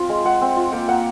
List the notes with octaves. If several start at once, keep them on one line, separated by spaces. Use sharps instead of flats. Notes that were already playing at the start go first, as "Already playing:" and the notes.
Already playing: C4 F4 F5
G#3
G#3 F#5
C4
F4
A#3 G5
A#3 F#5